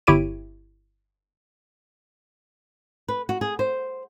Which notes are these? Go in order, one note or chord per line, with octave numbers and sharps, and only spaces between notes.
G1 E4 G4 C#5 D7 D#7
B4
F#4
G#4
C5